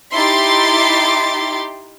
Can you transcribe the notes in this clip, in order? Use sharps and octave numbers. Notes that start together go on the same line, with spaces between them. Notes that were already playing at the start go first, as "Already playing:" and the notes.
D#4 E4 G4 C6 D6 A6